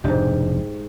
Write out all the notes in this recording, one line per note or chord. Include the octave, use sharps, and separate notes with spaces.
F1 G#2 B2 D4 G4